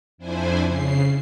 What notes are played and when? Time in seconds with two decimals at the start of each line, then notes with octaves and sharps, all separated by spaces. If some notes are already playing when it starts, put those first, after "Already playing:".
0.18 F2 D4 E4 C5 G#5
0.65 C#3 C7